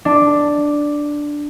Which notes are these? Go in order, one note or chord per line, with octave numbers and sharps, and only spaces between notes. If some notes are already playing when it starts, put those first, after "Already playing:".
D4